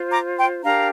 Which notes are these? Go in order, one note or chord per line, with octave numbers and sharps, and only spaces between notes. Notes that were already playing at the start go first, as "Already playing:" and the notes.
Already playing: F4 C5
A#5 D6
G5 C6
D4 G4 A#4 F5 A#5